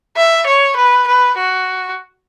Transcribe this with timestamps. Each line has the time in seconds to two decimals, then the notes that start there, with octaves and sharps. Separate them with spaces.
0.17 E5
0.46 C#5
0.77 B4
1.07 B4
1.37 F#4